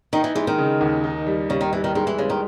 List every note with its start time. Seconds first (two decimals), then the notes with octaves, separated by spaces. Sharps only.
0.13 D#3 D#4
0.24 E3
0.35 E3 G#3
0.47 D#3
0.58 C#3
0.81 D#2
1.04 D#4
1.27 G3
1.49 C#3 G3
1.61 D#3
1.72 E3 G3
1.84 D#3
1.95 D#3 G#3
2.07 E3
2.18 C#3 G#3
2.30 D#3